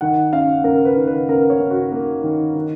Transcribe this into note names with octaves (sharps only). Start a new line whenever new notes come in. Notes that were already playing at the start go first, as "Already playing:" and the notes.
D#3 F#5
C#4 F5
C#4 A#4
B4
D#3
B4
C#4 A#4
C#5
C#4
F#4
A#3
D#3
D#3